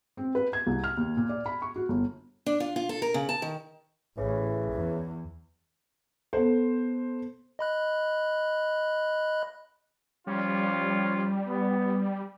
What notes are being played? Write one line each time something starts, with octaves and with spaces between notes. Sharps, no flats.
C4
B4
G#6
C2
F6
D#2
A#2
D5
B5
C#6
F#4
G1
D4
F4
F4
A4
A#4
C#3
A5
D#3
A1 C#3 E3
E2
B3 A4 C5
D#5 B5 F#6
F3 G3 C#4 F4
B3